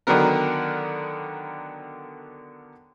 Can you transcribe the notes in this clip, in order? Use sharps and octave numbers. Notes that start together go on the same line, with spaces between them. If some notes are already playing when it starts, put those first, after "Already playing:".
D3 D#3 F#3 B3 A#4